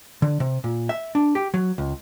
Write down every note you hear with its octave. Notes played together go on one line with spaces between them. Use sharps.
D3
C3
A#2
E5
D4
G4
F#3
C#2